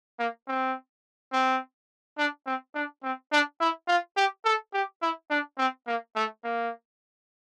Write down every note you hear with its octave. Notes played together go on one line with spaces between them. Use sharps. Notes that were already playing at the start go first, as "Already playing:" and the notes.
A#3
C4
C4
D4
C4
D4
C4
D4
E4
F4
G4
A4
G4
E4
D4
C4
A#3
A3
A#3